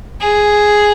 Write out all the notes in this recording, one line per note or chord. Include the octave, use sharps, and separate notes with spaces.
G#4